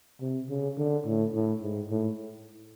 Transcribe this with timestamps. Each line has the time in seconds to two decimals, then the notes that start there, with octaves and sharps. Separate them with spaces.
0.21 C3
0.49 C#3
0.77 D3
1.06 A2
1.34 A2
1.62 G#2
1.90 A2